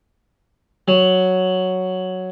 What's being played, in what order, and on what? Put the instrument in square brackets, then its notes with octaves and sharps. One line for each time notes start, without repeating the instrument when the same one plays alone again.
[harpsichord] F#3